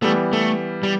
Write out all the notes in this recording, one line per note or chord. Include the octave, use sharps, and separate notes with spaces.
E3 G3 A3 B3
A3
G3